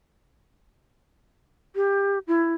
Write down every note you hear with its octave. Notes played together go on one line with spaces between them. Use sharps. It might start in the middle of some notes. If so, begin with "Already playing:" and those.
G4
E4